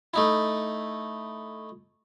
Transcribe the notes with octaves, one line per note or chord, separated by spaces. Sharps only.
A3 D#4 E4